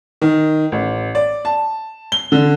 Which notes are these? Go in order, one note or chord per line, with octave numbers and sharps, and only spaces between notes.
D#3
A1
D5
A5
G7
D3